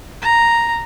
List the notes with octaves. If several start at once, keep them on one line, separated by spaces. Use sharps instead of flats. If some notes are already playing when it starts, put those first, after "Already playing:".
A#5